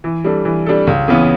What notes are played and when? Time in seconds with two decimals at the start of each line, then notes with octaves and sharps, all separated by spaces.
0.04 E3
0.24 G3 D4 A4
0.45 E3
0.66 G3 D4 A4
0.87 C#2
1.08 C#3 E3 B3